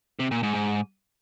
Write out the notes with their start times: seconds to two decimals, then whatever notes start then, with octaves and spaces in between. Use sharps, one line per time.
0.19 C3
0.31 A#2
0.43 G#2
0.55 G#2